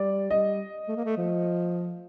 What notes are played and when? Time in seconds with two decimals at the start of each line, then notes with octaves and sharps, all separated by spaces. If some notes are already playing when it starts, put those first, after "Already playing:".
Already playing: G3 D5
0.31 G3 D#5
0.88 A3
0.96 A#3
1.05 A3
1.17 F3